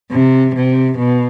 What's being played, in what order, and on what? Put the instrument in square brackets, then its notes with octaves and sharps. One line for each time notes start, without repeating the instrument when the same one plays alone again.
[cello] C3
C3
B2